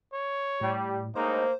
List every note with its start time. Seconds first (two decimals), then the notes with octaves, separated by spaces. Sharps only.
0.13 C#5
0.61 A2 G3 G4
1.15 A2 G#3 A#3 D#4 C5